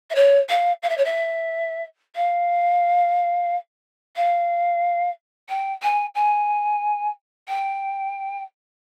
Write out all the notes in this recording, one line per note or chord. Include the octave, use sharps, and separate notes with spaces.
E5
C#5
F5
F5
E5
C#5
E5
F5
F5
G5
G#5
G#5
G5